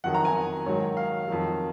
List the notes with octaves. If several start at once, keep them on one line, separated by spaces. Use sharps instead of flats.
F2 D#3 F#3 F#5
A#5
G#5
G#2 D#3 F#3 C#5
F5
F2 D#3 F#3